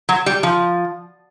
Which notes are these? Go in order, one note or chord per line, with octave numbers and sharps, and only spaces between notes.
F#3
G3
F3